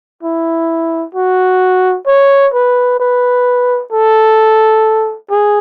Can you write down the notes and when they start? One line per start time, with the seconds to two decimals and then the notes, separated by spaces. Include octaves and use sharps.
0.23 E4
1.15 F#4
2.07 C#5
2.54 B4
3.00 B4
3.92 A4
5.31 G#4